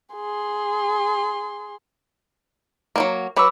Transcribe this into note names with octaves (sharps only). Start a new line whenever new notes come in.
G#4 C6
F#3 G#3 A#3
F#3 B4 B5 D6 E6